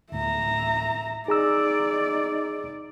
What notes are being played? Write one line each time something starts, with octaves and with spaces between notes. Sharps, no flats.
D2 A2 E5 A#5
D#4 G#4 D5 A#5 E6